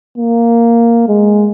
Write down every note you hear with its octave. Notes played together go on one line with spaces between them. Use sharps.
A#3
G#3